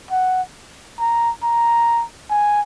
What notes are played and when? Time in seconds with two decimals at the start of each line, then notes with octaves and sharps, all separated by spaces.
0.11 F#5
1.00 A#5
1.43 A#5
2.30 G#5